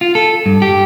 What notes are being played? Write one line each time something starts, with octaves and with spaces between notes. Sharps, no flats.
F4
A4
G2
G4